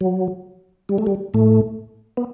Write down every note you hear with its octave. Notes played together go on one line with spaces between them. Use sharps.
F#3
G3
A3
G3
A2 A3
B3